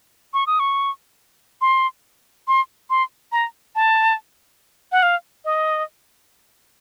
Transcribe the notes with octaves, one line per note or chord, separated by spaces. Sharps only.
C#6
D#6
C#6
C6
C6
C6
A#5
A5
F#5
F5
D#5